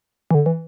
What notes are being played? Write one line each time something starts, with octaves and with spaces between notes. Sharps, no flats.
E3
D3
E3